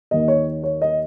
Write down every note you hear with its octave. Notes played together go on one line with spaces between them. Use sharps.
D#2 D#3 D#5
C#5
C#5
D#5